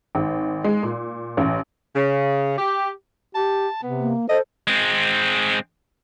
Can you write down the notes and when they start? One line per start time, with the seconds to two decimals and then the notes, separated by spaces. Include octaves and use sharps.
0.15 G#1
0.64 G#3
0.83 A#2
1.37 A1
1.96 C#3
2.58 G4
3.35 G4 A5
3.83 C3 B3
4.00 A#3
4.29 A4 C5 D#5
4.67 G#3 C4